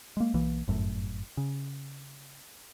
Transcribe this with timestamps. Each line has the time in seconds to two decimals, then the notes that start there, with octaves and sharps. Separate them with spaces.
0.17 G#3 A#3
0.34 B1 E3 A#3
0.68 G1 F#2 A2
1.37 C#3